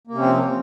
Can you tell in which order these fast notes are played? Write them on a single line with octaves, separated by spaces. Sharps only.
A#3 C3 C#4 C4 F3